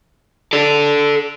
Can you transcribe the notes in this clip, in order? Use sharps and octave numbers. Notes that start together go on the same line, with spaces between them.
A4 D5